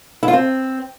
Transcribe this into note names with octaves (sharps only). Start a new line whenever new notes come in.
E4
F4
C4